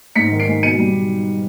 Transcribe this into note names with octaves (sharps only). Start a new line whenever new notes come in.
G#2 B6 C#7
D#3
C7 D7
G#3
B2 C#7 D#7
G3